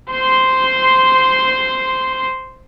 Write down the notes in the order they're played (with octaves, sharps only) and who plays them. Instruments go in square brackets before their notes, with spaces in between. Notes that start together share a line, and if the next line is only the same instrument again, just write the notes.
[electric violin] C5 C6